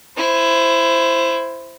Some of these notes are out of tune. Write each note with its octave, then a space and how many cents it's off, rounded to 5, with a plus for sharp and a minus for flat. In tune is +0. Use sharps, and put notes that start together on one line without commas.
E4 +15 C5 +0